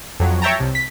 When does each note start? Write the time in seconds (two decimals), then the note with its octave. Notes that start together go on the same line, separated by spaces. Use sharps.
0.20 F2 F#3
0.42 C#5 E5 G5 A5 A#5
0.60 C2
0.75 B6